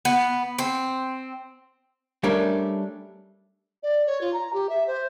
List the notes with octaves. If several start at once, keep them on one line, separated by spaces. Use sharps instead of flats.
B3
C4
G3 A3 C#4 D4 A#4
D5
C#5
F4
A#5
G4
E5
C5